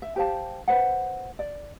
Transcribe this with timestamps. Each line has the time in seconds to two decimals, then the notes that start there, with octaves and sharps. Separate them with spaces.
0.02 E5
0.16 G4 C5 F5 A5
0.68 B4 C5 F#5
1.39 D5